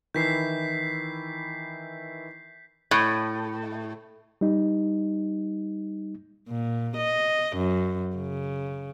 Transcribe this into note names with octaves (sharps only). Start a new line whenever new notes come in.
D#3 E3 E4 G6 B6 C7
A2
G3 D#4
A#2
D#5
F#2
C#3